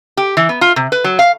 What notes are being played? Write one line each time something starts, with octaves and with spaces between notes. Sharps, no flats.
G4
E3
B3
F4
C3
B4
F#3
F5